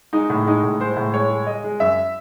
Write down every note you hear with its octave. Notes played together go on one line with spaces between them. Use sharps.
G#3 D#4
A2
G#3 D#4
A2
G#3 C5
A2
G#3 C#5
G#3
G#3 D#5
G#3
F#2 E5